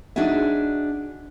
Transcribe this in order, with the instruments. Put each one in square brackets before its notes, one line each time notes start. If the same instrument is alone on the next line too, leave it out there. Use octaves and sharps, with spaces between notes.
[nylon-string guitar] D4 D#4 F#4 G#4 E5